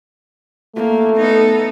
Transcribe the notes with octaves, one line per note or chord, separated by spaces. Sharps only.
A3 A#3
B3 D#4 A4